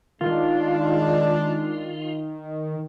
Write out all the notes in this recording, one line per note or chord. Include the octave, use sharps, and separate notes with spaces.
D#3 G#3 D4 F4